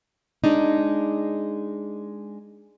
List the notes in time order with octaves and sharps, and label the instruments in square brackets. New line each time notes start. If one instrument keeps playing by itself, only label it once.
[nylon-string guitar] G#3 D4 D#4